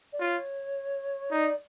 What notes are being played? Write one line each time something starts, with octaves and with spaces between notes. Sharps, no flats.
D5
F4 C#5
D#4 D5